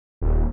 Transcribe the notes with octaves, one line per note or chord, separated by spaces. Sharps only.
D#1